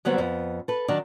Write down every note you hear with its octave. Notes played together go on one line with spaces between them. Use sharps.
D3 F#3 G3 B3 C4
F2 B3
A4 B4
D#3 F#3 D4